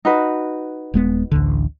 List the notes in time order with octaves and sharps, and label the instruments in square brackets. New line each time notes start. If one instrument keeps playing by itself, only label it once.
[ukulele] D#4 F#4 B4
[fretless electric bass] D#1 G#3 B3
A1 D2 D3